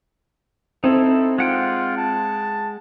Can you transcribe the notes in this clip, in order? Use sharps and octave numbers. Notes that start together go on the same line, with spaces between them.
C4 D#4 E4 A4
G#3 F4 F#5 G5
A5